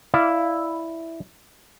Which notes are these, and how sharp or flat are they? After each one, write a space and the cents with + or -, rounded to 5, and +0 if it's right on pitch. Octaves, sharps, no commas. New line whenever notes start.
E4 +0 D5 +0 F5 -15